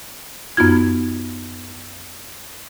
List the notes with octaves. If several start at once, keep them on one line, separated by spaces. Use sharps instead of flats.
F#2 B3 D#4 F4 G#6